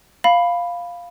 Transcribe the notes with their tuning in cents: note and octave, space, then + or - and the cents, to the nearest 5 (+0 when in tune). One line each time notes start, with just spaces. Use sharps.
F5 +0 B5 +0